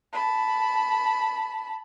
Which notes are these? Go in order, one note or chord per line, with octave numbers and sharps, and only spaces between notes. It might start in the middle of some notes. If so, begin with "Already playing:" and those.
A5 B5